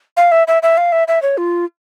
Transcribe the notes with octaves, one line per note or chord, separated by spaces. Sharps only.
F5
E5
E5
E5
F5
E5
E5
C#5
F4